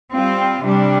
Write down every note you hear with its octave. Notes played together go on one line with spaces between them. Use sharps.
G3 C4 F4
C3 G3 D4